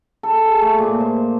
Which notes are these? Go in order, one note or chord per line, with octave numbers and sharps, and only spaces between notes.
A4
G#4
A3
A#2
C5